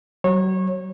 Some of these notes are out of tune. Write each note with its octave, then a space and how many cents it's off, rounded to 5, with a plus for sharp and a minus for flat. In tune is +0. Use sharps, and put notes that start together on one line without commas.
F#3 +35 C#5 -25